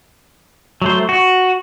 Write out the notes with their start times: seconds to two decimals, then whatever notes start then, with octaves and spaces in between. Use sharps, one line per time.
0.82 F#3 A3 C5
1.09 F#4